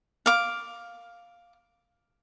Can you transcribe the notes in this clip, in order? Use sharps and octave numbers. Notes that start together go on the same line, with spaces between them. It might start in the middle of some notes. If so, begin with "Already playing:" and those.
F5 D6